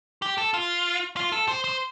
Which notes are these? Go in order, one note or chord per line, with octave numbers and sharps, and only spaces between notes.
G4
A4
F4
F4
A4
C5
C5